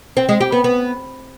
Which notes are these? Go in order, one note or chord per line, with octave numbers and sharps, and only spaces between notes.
C4
G#3
G4
B3
B3